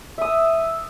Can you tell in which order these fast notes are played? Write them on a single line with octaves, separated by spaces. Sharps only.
E5 D#6 E6